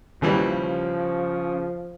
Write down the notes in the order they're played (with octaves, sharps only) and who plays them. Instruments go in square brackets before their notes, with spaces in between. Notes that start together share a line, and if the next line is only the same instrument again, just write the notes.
[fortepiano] D#2 E3 G3 [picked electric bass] C#3 [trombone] F3